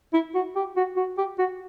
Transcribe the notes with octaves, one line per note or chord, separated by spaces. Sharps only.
E4
F#4
G4
F#4
F#4
G4
F#4